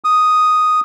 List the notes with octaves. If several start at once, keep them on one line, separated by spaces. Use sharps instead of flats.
D#6